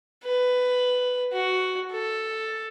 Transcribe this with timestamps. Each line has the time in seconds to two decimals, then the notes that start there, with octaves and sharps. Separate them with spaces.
0.24 B4
1.32 F#4
1.92 A4